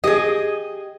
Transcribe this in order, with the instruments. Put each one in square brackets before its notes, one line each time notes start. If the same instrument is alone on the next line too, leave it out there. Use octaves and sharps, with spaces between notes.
[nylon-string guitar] G4 [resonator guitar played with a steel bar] G#4 D#5